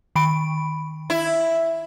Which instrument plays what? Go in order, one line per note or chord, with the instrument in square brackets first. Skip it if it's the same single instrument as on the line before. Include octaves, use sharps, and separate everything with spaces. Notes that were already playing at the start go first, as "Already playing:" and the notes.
[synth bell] D#3 B5 D7
[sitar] E4